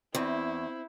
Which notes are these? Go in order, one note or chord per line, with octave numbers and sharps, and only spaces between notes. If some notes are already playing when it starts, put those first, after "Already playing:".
E2 C4 E4